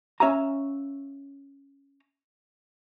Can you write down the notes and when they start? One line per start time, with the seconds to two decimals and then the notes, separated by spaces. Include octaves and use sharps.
0.20 C#4 C#5 E5 F5 G#5 A#5